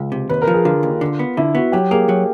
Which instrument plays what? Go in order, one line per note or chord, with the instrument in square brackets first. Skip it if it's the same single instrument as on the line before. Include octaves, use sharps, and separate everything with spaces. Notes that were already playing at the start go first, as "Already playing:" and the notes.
Already playing: [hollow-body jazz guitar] C#2
C3
[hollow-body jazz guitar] D#2 [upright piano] B4
[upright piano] A#4
[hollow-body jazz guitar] F3
[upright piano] G#4
[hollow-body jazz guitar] D3 [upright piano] F4
[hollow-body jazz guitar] D#2
D3
B3
[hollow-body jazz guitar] D3 [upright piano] E4
[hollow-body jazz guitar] B3 [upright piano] F#4
[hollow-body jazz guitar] F#3 [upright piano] G4
[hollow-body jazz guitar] A#3 [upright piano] G#4
[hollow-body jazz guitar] F#3